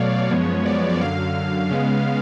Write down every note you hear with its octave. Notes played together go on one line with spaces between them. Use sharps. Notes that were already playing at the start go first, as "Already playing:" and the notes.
Already playing: B2 F#3 A3 C#5 D5 F5
F#2 F3 G#3 B3
D5
D5
D5
F#2 D3 F#3 F5
C#3 G#3 B3